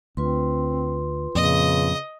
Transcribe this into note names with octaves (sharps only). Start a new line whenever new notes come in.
D2 C4 F4 B4 C6
F2 A#2 C#3 D#5